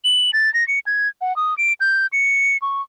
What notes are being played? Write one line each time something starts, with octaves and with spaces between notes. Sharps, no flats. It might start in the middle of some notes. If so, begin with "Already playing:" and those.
F#7
A6
A#6
C#7
G#6
F#5
D#6
D7
G6
C#7
C#6